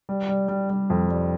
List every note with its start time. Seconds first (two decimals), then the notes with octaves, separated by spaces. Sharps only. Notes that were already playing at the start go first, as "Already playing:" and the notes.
0.09 G3
0.29 G3
0.48 G3
0.70 G3
0.90 F2
1.09 G3